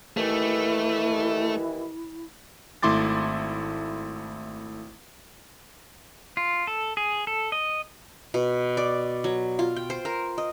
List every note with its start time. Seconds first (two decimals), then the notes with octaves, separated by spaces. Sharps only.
0.17 D#2 E3 A3 E4
2.83 G#1 A3 E4 C6 D6 A6
6.37 F4
6.67 A4
6.97 G#4
7.27 A4
7.52 D#5
8.34 B2
8.77 D5
9.24 F#3
9.59 F4
9.76 G5
9.90 C5
10.05 A#4
10.38 D#5